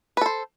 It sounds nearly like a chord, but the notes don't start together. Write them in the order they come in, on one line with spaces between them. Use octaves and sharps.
B4 A4 C5